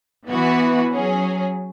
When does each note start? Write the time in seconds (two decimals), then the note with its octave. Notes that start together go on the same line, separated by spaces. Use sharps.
0.28 E3 B3 F#4 B4
0.91 F#3 C#4 G#4